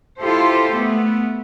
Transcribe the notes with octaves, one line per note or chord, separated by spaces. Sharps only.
E4 F4 G4 A4 C5
A3 B3